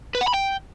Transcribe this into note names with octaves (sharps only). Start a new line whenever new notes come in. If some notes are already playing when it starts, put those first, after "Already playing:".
B4
F#5
B5
G5